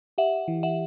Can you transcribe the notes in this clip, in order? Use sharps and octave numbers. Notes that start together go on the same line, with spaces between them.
G4 E5 F#5
E3
E5 F#5